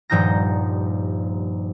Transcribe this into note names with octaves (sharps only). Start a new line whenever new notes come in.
D#1 G2 F3 D#4 G6 A#6